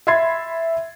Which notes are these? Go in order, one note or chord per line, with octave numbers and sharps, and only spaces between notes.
E5 B5 C6 G#6 A6 C7